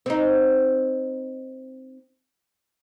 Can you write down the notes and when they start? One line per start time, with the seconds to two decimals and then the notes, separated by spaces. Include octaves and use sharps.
0.06 C4 D#4